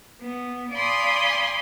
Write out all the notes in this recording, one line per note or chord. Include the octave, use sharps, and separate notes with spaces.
B3
D5 F5 G#5 B5 C6 D#6